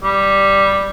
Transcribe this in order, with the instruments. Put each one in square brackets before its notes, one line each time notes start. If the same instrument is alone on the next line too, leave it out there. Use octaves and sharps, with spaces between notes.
[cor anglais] G3